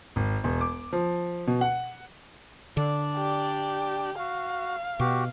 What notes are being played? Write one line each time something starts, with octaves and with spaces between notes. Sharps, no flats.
G#1
E1
D6
F3
B2
F#5
D3 D4 D5
G4
F#4 F5
B2 F#4 G4